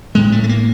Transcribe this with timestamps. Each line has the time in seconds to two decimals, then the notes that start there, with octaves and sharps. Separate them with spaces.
0.15 A1 A2 G#3
0.32 A3
0.44 A3
0.49 A#3